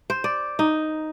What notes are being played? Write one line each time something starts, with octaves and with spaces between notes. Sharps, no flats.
C5
D5
D#4